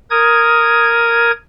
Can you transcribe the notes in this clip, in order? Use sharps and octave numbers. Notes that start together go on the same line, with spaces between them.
A#4 D#6 G#6